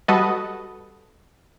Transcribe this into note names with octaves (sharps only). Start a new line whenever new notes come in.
G3 F#4 A4 B4 D#5